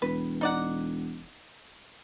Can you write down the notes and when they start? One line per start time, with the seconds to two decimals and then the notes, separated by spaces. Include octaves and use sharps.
0.02 E1 B4
0.41 D#4 D5 F#5